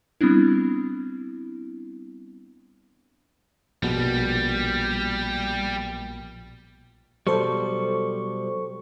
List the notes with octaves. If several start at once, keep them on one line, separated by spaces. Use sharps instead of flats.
G3 B3 C4 D4 E4
A#1 B2 G3
B2 F#3 G3 A4 C5 C#6